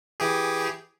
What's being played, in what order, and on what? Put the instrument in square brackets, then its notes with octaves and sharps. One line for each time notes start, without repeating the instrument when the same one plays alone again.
[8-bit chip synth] E3 G4 G#4